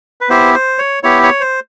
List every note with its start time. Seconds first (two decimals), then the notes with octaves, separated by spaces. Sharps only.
0.21 B4
0.29 B3 E4 G4 C5
0.54 C5
0.79 C#5
1.03 B3 E4 G4 C#5
1.23 C#5
1.40 C5